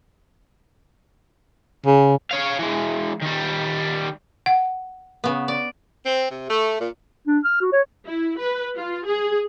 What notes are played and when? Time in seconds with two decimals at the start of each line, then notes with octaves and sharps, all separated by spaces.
1.86 C#3
2.31 C#5 F5
2.59 E3 G#3
3.21 D#3 G3
4.46 F#5
5.24 C#3 B3
5.48 D5
6.06 C4
6.30 C3
6.49 A3
6.79 A#2
7.27 D4
7.44 F6
7.61 F#4
7.72 C#5
8.06 E4
8.38 B4
8.77 F4
9.06 G#4